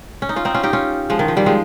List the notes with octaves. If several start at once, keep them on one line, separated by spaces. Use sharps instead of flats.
C#4
D#4
C#4 F4
C4 D#4
C#4 F4
D#4 G4
C#4 F4
F3 G#3
D#3
F3
D#3 G3
F3 G#3